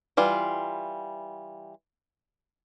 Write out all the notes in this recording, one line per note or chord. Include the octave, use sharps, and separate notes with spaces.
E3 G3 F4